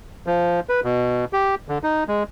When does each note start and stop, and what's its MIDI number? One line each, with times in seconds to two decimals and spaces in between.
0.27 0.60 53
0.69 0.80 71
0.84 1.25 47
1.33 1.55 67
1.68 1.78 50
1.83 2.04 63
2.08 2.23 56